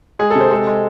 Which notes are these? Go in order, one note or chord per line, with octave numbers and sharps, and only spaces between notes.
G#3 G#4
A4
C3
C5
G#3 A4
G#3